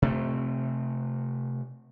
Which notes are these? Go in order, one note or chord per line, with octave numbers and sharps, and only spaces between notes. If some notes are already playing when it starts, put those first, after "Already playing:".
C3 A3 C4